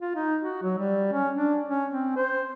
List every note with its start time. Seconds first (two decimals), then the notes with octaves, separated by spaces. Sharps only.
0.01 F4
0.16 D#4
0.41 F#4
0.63 F#3
0.78 G3
1.12 C#4
1.34 D4
1.68 C#4
1.91 C4
2.16 C5